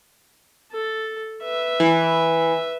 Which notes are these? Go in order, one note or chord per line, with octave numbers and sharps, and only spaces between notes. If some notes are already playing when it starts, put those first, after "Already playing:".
A4
B4 E5
E3